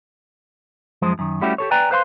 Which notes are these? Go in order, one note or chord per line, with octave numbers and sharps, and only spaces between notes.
F#2 F3 G#3 C5
F#2 D#3
G3 A3 C#4 E4 F#4 G4
G4 A4 C#5
B4 D5 G5 G#5 A#5
B4 C5 F5 B5 C6